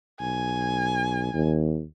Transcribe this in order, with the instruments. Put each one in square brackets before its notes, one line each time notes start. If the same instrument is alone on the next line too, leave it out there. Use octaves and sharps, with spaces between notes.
[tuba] B1 [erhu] G#5
[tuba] D#2